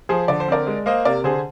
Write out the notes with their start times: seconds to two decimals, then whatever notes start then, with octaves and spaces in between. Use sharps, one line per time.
0.09 F3 G#4 C5
0.28 D3 D5
0.40 C5
0.48 C4 A#4 D5
0.67 G#3
0.86 A#3 C5 D#5
1.05 C3 A#4 D5
1.24 D3 G#4 C5